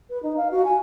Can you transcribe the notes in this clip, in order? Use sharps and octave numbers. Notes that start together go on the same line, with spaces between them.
B4
D#4
F5
F#4
G#5